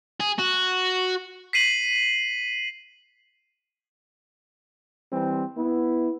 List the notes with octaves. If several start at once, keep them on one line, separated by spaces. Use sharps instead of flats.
G#4
F#4
B6 C7 D#7 F#7
E3 G3 C4
B3 E4